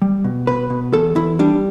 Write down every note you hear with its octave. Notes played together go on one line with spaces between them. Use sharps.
G3
B2
B2 B4
B2
E2 A4
E2 E4
G3 D4